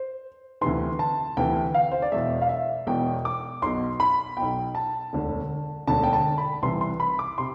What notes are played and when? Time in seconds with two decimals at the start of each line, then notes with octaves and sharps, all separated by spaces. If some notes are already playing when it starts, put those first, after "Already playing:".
Already playing: C5
0.61 D2 C3 E3 C6
0.99 A5
1.37 D2 C3 E3 G5
1.74 F5
1.91 C5
2.02 D5
2.12 E1 E2 B2 E5
2.41 F5
2.49 E5
2.87 E1 E2 B2 G5
3.25 D6
3.62 B1 B2 C6
4.00 B5
4.37 B1 B2 G5
4.75 A5
5.13 E1 D2 D3
5.87 E1 D2 D3 A5
6.04 G5
6.13 A5
6.38 B5
6.62 C2 C3 E3 C6
6.81 C6
7.00 B5
7.19 D6
7.38 C3 C6